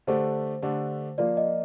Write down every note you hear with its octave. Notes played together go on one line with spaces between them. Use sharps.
D3 A3 D4 G4 C5
D3 A3 D4 G4
F3 A#3 F4 D5
D#5